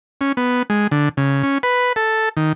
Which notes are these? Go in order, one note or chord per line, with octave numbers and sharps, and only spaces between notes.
C#4
B3
G#3
D3
C#3
C#4
B4
A4
D#3